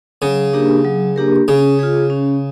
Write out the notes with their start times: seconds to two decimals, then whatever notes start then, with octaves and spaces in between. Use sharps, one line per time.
0.22 C#3 F#3
0.53 A#3 D4 G4 A#4
0.85 F#3
1.16 A#3 D4 G4 A#4
1.48 C#3 C#4
1.79 F4 G#4
2.10 C#4